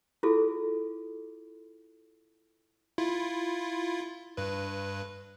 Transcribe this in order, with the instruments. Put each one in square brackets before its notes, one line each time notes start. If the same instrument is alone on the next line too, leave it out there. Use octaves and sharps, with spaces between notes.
[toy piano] E4 F4 G#4 A4
[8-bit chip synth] E4 F4
G2 B4